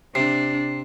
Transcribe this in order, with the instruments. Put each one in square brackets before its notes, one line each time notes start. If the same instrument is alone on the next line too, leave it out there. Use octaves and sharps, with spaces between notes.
[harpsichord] C3 [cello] D4 [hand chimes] C7